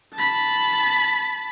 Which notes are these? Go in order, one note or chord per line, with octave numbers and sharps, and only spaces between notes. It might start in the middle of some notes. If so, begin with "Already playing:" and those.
A5 B5